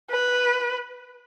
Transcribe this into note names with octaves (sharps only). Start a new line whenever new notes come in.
B4